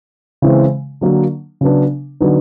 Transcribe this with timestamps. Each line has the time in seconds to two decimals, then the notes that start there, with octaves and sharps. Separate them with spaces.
0.42 C#3 E3 G#3 C4
1.01 D3 F#3 A#3
1.61 C#3 F#3 B3 D4
2.21 D3 F#3 B3 D#4